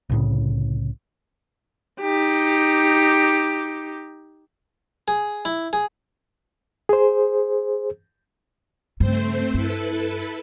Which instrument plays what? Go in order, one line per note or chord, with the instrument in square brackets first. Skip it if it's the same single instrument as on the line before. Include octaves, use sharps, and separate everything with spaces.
[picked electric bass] C2 A2 C#3
[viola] D#4 G4
[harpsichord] G#4
E4
G#4
[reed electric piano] G#4 C5
[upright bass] G2 C#3 [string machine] A3 C4 C5
[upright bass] G2 [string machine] E4 A4 B4